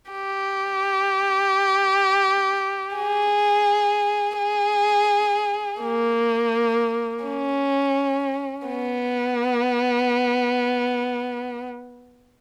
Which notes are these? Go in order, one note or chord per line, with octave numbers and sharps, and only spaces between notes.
G4
G#4
G#4
A#3
C#4
B3